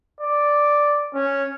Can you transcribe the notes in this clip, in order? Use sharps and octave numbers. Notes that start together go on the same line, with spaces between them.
D5
C#4